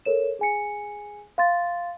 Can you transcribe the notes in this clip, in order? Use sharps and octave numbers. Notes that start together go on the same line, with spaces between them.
A4 A#4 C#5 E7
G#4 G#5 C#7
F5 C6 A6